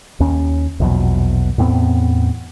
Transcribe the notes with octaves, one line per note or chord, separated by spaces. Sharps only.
D#2 C#4
A#1 E2 B2 F#3
E2 A2 B3 C4